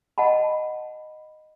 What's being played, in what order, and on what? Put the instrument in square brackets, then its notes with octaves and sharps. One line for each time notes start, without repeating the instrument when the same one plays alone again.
[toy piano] D#5 F#5 A5 B5